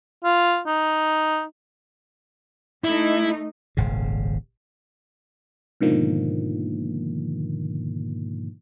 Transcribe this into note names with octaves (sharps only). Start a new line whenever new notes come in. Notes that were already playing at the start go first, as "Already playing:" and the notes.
F4
D#4
A3 D#4 E4
D#1 G#1 C#3
G#2 B2 D3 D#3 F3 A#3